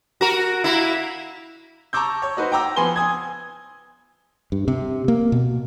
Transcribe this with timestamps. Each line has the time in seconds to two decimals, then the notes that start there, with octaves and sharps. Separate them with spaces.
0.21 F#4 A#4
0.64 A#3 E4
1.93 A5 A#5 C#6 D6 E6 G6
2.22 C#5
2.37 D#4 F#4 B4 C5
2.52 G5 A#5 D6 E6 A#6
2.76 F3 B3 G#5 B5 C6 G7
2.96 G#5 D#6 G#6
4.52 G2
4.68 C3
5.08 A#3
5.32 B2